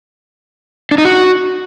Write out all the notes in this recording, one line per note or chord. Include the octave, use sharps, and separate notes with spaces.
D4
D#4
F#4